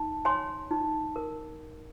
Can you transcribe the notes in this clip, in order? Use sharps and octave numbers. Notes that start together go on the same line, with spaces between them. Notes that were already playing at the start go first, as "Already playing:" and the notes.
Already playing: D#4
C#5 G#5 C6
D#4
A#4